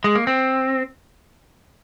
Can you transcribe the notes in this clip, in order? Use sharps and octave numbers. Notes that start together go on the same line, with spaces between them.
G#3
A#3
C4